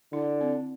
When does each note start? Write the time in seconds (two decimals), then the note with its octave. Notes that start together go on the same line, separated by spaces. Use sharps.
0.12 D3 E4
0.41 C4